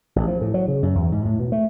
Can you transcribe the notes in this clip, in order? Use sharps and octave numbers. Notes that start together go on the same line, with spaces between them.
A1
F3
A2
F#3
C#3
F#2
E2
G#2
A2
B2
A3